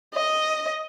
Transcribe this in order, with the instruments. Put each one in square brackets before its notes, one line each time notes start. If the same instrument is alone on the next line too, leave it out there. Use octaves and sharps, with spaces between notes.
[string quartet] D#5